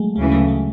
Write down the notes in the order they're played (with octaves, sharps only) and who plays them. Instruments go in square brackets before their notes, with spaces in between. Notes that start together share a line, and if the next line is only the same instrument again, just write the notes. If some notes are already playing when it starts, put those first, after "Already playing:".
Already playing: [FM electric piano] F#3 G#3 A3
[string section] D2 C#3 E3 [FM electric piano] G#3
[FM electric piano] F#3 A3
G#3